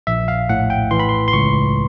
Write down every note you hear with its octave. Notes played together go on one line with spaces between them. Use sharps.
A#1 E5
F5
A2 F#5
G5
E3 C6
B5
C6
C6
C#2 C#6